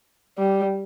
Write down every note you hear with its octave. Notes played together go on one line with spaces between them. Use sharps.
G3